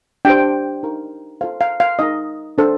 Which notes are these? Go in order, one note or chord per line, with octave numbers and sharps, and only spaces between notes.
D4 G4 C5 G5
D#4 A#4
F4 A4 C5 F5
F5
F5
D#4 A#4 D#5
D4 A4 C5